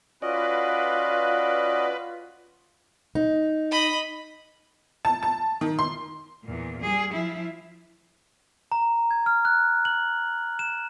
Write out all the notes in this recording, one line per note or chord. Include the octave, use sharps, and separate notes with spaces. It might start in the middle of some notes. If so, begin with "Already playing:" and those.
C#4 F4 F#4 B4 D5 D#5 F#5
D#4
D#5 B5
A5
A5
D#3
C6
E2 A#2
G3 G#4
F3 E4
A#5
G#6
F6
F#6
F#7
E7